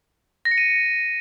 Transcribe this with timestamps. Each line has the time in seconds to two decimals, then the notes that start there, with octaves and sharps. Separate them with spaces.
0.45 A#6
0.51 C#7
0.58 D#7